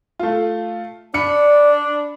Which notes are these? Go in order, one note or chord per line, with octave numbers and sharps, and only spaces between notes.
A3 F4
D4 D5 B5 C#7